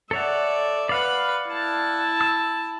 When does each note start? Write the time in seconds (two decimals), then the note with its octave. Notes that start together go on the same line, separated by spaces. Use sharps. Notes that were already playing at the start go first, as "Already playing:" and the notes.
0.11 A4 C#5 D5 E5 F#5
0.89 B4 D5 F5 F#5 B5
1.48 E4 A5
2.21 E6